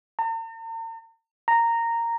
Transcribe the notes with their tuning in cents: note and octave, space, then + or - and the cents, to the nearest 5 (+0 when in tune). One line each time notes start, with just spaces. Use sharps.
A#5 -45
A#5 -10